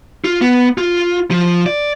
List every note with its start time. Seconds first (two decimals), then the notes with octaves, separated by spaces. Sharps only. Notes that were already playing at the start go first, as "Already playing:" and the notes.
0.25 F4
0.41 B3
0.78 F4
1.31 F3
1.66 D5